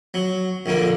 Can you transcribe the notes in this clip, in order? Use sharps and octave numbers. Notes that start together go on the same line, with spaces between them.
F#3
A#1 D3 A#3